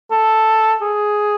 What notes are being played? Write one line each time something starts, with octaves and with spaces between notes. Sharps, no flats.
A4
G#4